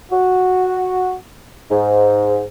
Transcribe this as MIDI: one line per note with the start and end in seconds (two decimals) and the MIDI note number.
0.11 1.15 66
1.71 2.43 44